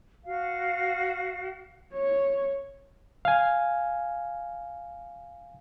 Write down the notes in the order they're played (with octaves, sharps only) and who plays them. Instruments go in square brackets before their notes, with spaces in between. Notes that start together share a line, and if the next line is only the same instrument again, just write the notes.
[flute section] F#4 F5
[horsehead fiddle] C#5
[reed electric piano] F5 G#5